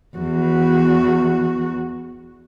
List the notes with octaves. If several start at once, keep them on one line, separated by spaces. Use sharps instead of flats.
E2 F#4